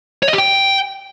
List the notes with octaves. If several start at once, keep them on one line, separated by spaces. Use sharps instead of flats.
C#5
D#5
G4
G5